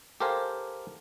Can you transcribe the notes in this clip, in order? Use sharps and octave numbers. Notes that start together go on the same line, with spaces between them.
G4 A4 A#4 C5 F5 G#5